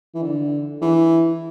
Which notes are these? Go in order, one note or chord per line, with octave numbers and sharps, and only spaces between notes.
E3
D3
E3